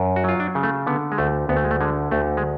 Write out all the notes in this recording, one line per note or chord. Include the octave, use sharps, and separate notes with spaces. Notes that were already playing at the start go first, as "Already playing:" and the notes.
Already playing: F#2
F#4
F#3 F4
D4
C#3
A3
D3 B3
G#3
D2 A3
D2 B3
A3
G#3
A3
D3 G#3
D2 A3
G#3